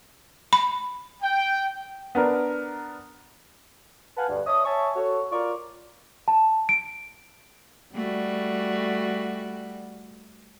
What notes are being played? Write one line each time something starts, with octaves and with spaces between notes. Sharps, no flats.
B5
G5
B3 D4 A#4
B4 F5 F#5 G#5 A5
D2 G2
C#5 E5 A5 D#6
C#5 E5 G#5 A5 C#6
F#4 A4 C#5
F4 A#4 D5 C#6
A5
D7
G3 A3 F#4